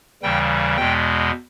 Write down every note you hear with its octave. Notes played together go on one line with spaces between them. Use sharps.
D#2 C#3 E3 G3 G5
E2 B2 G#3 G5